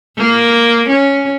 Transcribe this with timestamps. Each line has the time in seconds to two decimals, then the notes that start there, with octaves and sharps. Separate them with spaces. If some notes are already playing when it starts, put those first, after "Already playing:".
0.17 A#3
0.88 C#4